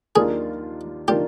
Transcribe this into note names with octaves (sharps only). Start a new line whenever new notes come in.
D#2 D#3 A#3 D4 F4 G#4
D#3 A#3 D4 F4 G4